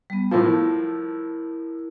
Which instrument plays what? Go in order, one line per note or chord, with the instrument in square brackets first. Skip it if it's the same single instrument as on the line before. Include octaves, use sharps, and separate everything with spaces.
[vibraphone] G3 B3
[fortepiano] A2 F3 [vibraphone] E4 A#4